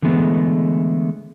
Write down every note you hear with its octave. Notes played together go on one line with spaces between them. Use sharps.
D3 E3 G#3 A3 B3